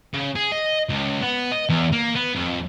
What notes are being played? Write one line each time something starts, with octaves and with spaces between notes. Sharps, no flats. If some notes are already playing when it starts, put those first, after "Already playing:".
C#3
G#4
D#5
C#2
B3
D#5
E2
A#3
B3
F2